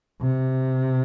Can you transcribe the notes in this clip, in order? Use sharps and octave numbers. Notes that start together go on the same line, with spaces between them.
C3